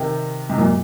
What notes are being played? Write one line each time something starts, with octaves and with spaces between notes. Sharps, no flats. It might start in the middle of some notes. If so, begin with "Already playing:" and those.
Already playing: C3 D#3
G#2 C3
F#2 A#2